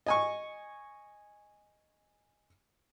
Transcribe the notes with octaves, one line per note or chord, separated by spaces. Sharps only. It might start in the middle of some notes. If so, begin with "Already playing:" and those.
D#5 G#5 C#6